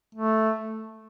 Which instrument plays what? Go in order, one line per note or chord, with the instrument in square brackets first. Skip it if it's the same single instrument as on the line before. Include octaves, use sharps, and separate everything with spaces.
[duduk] A3